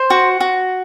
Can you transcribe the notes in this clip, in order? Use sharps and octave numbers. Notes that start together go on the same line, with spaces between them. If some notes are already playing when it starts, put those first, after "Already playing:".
Already playing: C5
F#4
F#4